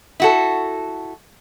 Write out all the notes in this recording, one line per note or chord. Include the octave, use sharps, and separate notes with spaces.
E4 F#4 A4